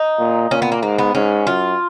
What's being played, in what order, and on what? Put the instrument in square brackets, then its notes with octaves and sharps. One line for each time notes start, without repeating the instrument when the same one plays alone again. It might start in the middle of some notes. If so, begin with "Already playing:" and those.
Already playing: [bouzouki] D#4
[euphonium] A#2
[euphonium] A#2 [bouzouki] C#4
[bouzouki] B3
A#3
[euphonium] G#2 [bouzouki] A#3
[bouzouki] B3
[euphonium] G#2 [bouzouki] C#4
[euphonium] F#2 [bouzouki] F4